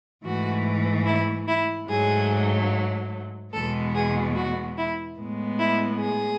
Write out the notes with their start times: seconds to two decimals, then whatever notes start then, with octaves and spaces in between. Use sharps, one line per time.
0.24 G#2 E3 A3 F#4
1.06 E4
1.48 E4
1.89 G#2 F#3 A3 G#4
3.53 E2 B2 G#3 B3 A4
3.95 G#4
4.35 F#4
4.77 E4
5.18 A2 G#3 B3
5.59 E4
6.00 G#4